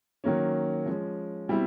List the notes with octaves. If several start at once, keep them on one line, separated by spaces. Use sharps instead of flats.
D#3 F#3 A#3 C#4
F3 G#3 C#4
B2 G3 C4 E4